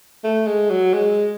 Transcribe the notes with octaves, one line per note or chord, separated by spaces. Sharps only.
A3
G#3
F#3
G#3